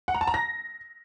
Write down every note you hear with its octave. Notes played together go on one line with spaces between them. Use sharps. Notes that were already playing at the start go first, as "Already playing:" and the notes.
F#5
A#5
A5
A#5
A#6